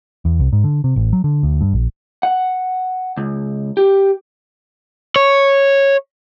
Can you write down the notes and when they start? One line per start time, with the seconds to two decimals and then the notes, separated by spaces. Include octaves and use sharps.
0.25 E2
0.40 C2
0.53 G#2
0.64 D3
0.84 C3
0.96 A1
1.13 F#3
1.24 D3
1.43 D2
1.61 G2
1.74 A#1
2.23 F#5
3.17 C#2
3.77 G4
5.16 C#5